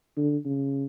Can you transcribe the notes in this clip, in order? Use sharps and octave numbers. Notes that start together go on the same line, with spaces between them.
D3
C#3